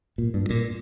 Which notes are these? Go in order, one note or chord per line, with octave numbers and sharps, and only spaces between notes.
A#2
G2
A#2